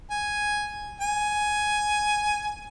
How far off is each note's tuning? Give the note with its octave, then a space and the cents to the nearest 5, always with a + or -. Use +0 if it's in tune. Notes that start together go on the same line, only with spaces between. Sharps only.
G#5 +0
G#5 +10